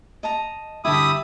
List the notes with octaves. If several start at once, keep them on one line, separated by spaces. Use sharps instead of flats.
D#5 A5 A#5
G2 D3 E4 G4 E5 A5 B5 D#6